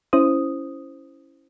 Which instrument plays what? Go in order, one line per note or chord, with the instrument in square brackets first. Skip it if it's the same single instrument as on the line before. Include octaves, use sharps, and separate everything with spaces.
[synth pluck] C#4 E4 C5 D#6